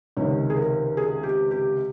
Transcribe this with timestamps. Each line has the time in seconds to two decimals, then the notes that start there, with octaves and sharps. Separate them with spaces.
0.17 C#2 C3 D#3 C#5
0.50 G#4
0.57 A#4
0.97 G#4
1.23 G4
1.51 G4